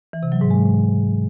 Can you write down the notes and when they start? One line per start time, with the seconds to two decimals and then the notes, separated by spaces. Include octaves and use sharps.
0.13 E3
0.23 C3
0.32 F#3
0.41 G#2
0.51 G#3